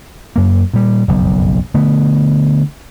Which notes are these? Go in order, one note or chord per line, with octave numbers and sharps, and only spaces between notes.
F#2 A#3
A#2 G3
F#1 B1 F2
D3 A3 B3